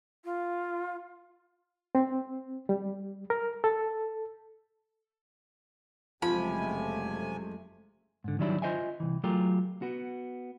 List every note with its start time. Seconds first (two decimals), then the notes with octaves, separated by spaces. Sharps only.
0.24 F4
1.95 C4
2.69 G3
3.30 A#4
3.64 A4
6.22 F#1 C3 F3 G#3 A3 G#5 B5
8.24 G#2 D3
8.39 D#3 F#3 G3 D4 E4
8.62 F4 C5 D#5 E5 G#5
9.00 C2 E3
9.24 F#3 A3 F4 G4 G#4 A#4
9.82 B3 F#4